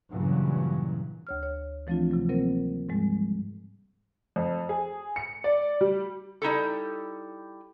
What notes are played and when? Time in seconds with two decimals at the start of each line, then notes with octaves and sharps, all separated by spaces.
0.11 G2 A#2 C#3 E3 F#3
1.27 D2 C#5 F6
1.43 C#5
1.87 E3 F3 A3 C4 D4 F4
2.11 C3 F#3
2.29 C3 F#3 A#3 C4 A#4 C5
2.89 G#2 F3 G3 G#3
4.36 F2
4.69 G#4
5.16 C#7
5.44 D5
5.81 G3
6.42 G3 D#4 E4 A4